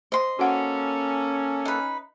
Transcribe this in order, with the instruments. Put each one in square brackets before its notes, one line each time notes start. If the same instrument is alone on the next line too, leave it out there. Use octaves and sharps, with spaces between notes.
[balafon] C5 [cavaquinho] D#5 C6
[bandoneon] A#3 A4 [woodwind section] C#4 [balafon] F#4 F#5
[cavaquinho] D#4 B4